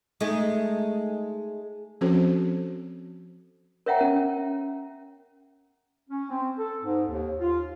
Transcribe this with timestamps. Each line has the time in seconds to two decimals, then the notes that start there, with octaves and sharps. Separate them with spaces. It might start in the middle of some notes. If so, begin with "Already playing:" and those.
0.21 G#3 A3 D#4
2.01 F3 C4 C#4 F#4 A4 C5
3.86 A#4 C#5 E5 F#5 G5 A#5
4.01 C#4
6.09 C#4
6.30 C4
6.58 A4
6.83 G#2
7.08 D#2
7.40 F4